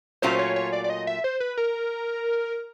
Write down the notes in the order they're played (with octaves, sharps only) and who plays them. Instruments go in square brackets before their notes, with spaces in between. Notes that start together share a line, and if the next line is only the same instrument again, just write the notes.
[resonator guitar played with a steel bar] A#2 F#3 A3 C#4 F4 [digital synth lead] C5
[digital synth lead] C#5
C#5
D5
D5
D#5
E5
C5
B4
A#4